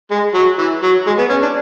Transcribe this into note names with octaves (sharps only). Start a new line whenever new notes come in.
G#3
F#3
E3
F#3
G#3
B3
C#4
D4